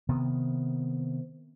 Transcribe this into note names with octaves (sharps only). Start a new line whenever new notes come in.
C3 D#3 B3